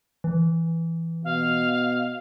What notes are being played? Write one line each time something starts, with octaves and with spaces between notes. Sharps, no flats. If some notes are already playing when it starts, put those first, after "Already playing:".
E3
B2 F5